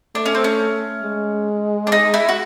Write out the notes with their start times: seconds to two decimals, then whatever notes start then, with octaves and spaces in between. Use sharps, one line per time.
0.15 A3 D4
0.25 C#4
0.35 C4
0.44 C#4
1.03 G#3
1.87 D4
1.92 D#4
2.14 E4
2.29 F#4